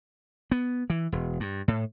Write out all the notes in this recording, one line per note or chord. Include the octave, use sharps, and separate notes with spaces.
B3
E3
E1
G2
A2